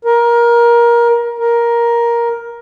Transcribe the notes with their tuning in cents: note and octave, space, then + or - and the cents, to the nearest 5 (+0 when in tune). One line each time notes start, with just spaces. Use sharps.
A#4 +20
A#4 +10